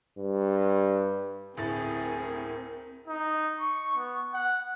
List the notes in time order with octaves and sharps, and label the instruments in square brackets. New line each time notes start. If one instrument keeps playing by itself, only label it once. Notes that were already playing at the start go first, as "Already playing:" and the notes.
[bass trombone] G2
[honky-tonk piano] D2 A2 A6 [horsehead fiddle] C4 A#4 [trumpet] G#4
[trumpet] D#4
C#6
B3
F#5